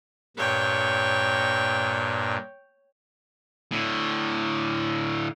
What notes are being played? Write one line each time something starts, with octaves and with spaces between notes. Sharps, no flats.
G2 A#2 C#5 G5
A2 D3